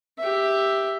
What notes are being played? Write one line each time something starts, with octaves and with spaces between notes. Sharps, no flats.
G4 E5